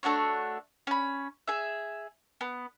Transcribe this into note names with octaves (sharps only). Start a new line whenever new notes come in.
A3 D4 F#4 C#5
C#4 B5
G#4 E5
B3